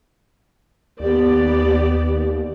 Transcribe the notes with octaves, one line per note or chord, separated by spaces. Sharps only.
D#2 B3 G4 D5